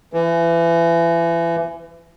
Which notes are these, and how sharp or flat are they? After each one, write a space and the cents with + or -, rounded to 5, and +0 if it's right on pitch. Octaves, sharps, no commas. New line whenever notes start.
E3 +30